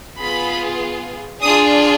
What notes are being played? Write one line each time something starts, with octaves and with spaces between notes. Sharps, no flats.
B3 F4 G#4 B5
D4 F4 G#4 D#6